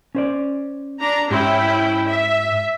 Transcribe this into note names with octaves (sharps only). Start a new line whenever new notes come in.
C#4 C5 D5
D4 A#5
G#2 C#4 E4 G4 G5 C6
E5